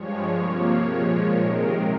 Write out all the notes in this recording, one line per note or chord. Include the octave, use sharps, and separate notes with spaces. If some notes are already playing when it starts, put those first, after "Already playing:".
Already playing: G2 F3 G#3 C#5
C3 F3 A#3
A#2 F3 G#3
C3 D#3 G#3 A#4